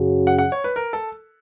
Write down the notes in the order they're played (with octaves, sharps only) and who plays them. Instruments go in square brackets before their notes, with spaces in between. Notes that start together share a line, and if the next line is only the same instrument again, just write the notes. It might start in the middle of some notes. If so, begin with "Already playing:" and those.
Already playing: [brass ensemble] F#2 C#3 F#3
[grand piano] F#5
F#5
C#5
B4
A#4
A4